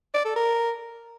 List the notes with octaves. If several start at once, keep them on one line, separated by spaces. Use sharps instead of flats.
D5
A4
A#4